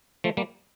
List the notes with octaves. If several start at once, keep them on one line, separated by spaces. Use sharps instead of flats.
F3 A3
G3 A#3